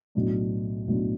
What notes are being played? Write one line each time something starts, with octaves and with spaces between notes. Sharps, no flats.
B1 A2 F#3 B3 D4
B1 A2 F#3 B3 D4